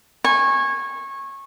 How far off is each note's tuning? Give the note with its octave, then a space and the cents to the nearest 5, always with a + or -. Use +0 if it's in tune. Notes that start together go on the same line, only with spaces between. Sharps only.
G#5 -15 C#6 -20